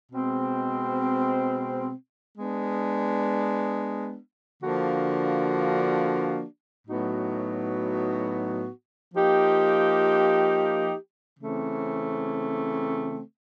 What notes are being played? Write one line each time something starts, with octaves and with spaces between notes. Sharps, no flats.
B2 G#3 C4
G#3 B3 D4
D3 F3 A#3 D4 F#4
A2 F#3 B3 D#4 F#4
F3 A#3 D#4 G4
C#3 E3 A3 C4